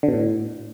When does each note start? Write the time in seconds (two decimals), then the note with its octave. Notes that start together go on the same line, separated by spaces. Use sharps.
0.03 D3
0.08 B2
0.13 A2